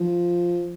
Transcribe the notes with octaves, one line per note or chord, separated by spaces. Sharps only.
F3